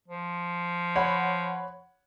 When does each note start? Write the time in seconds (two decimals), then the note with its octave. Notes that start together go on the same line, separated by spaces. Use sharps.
0.08 F3
0.96 C#5 F#5 B5